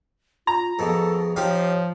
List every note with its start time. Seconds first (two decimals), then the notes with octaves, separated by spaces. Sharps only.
0.47 F4 A#5
0.79 F2 B2 G#4 A4
1.36 F3 D#4 G4 C#5 F5